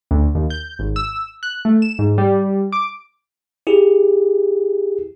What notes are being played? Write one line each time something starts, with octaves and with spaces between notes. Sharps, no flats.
D2
D#2
G6
G#1
E6
F#6
A3
E7
G#2
G3
D6
E4 G4 G#4